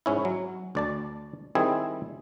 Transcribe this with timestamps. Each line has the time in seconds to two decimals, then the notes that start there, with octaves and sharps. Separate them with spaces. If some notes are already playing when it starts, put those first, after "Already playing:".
0.06 G#2 C#4 E4
0.25 F#3
0.75 D2 D5 A5
1.55 D#3 G3 C4 E4 G#4